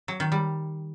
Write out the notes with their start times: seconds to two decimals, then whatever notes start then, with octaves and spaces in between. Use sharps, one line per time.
0.08 F#3
0.20 D#3
0.32 G3